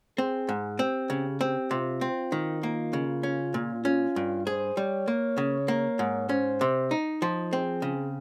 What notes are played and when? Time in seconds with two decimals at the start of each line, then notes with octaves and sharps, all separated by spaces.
0.18 C4 G#4
0.49 G#2
0.79 C4 G4
1.10 C#3
1.41 C4 G4
1.71 C3 F4
2.01 C4
2.32 D#3
2.62 A#3 F4
2.93 C#3
3.23 C#4
3.54 A#2
3.85 C#4 F4
4.16 G2
4.46 G#4 C5
4.77 G3 C#5
5.08 A#3
5.38 C#3
5.68 A#3
5.99 G#2
6.29 C#4 C5
6.61 C3
6.91 D#4
7.22 F3
7.52 C4 G#4
7.82 C#3